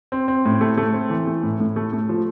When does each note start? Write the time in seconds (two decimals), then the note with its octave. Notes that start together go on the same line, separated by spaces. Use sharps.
0.12 C4
0.28 C4
0.45 A2
0.61 A3
0.77 A3
0.94 C4
1.10 E3
1.27 A3
1.43 A2
1.60 A2
1.76 A3
1.93 A3
2.09 F3